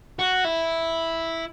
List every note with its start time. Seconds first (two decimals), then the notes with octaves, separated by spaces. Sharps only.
0.19 F#4
0.45 E4